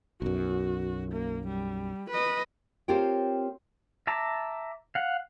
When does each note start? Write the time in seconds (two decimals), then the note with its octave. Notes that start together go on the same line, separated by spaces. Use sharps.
0.22 B1 F#2 F#4
1.12 A#3
1.47 G3
2.10 B4 D#5
2.88 C4 F4 G4 A#4 C#5 G5
4.07 E5 A5 A#5 D6
4.95 F5 F#5